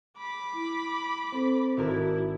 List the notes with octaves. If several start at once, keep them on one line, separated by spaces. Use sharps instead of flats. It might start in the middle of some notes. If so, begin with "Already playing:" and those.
B5 D6
E4
C4 A4 C5
G#1 E4 F#4 A#4 D5